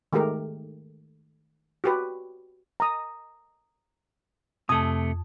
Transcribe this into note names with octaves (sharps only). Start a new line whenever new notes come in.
D#3 G#3 A3 G4 A#4
F#4 G4 B4
A#5 D#6
F2 C3 A3 A5 D#6